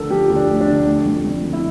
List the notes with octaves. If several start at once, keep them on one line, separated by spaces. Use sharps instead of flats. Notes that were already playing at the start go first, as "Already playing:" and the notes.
Already playing: D2 D3 F3 A3 A4 A#4
F3 G4
D2
D4
A3
D4
D3
A3
F2
F2
D3
E4